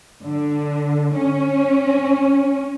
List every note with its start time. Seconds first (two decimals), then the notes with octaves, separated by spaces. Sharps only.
0.24 D3
1.15 C#4